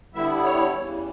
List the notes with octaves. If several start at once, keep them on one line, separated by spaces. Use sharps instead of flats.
D3 G3 B3 E4 E5
C#5
E2 C#3 E3 G3